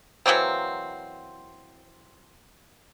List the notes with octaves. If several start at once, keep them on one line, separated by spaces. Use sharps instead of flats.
E3 F#3 A#3 C4